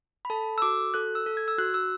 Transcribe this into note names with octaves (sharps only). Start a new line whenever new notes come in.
B5
A4 A5
E6
F#4 D6
A4 F#6
E6
A4
G#6
E6
F#4 F#6
E6